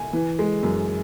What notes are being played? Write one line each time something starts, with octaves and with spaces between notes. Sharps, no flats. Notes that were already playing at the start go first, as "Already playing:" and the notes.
Already playing: G#5
E3
G#3
F#2